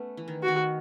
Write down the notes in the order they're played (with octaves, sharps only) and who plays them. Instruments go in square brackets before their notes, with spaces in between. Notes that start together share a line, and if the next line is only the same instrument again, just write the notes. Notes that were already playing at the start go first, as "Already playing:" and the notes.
Already playing: [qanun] A3 B3 C#4
E3
D#3
[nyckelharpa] F#4
[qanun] D#3